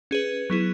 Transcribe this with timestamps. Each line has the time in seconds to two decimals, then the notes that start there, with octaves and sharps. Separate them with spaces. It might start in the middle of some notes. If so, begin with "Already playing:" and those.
0.11 C#4 G#4 B4
0.50 F#3 B3 E4 G#4